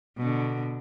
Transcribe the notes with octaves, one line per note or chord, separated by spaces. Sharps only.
B2 D3